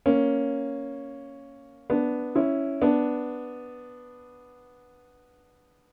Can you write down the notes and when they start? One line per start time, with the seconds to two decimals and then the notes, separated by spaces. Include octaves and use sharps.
0.06 A#3 C#4
1.90 B3 D4
2.35 C#4 E4
2.82 B3 D4